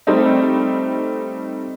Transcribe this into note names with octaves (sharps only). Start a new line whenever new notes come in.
G3 A3 C4 D#4